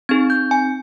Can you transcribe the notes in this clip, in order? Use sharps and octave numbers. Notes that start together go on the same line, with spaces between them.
C4 D#4 G#4 G#6
G6
G#5